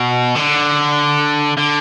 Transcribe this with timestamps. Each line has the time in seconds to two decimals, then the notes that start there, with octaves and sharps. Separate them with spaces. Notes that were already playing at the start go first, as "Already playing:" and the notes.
Already playing: B2
0.36 D3
1.57 D3